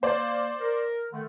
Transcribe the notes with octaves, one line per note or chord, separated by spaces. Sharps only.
A#3 C5 D5
A#4
D3 D#3 A3